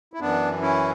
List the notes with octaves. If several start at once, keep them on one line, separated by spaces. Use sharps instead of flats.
E4
F#2 E3 B3 D4
C#4 E4